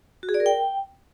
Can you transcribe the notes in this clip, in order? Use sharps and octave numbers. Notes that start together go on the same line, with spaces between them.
F#4
G#4
D5
A#4
G5